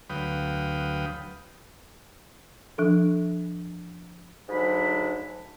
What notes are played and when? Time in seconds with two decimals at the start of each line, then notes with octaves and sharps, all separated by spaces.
0.10 D2 F#3 B4 F5 G5 D#6
2.78 F3 D4 A4
4.49 D2 G#2 F#3 D4 B5